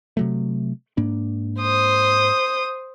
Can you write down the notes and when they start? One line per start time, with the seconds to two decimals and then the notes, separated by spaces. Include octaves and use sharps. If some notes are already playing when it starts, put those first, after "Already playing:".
0.17 C3 F#3 A3
0.97 G#2 A#3 D4
1.59 C5 D#6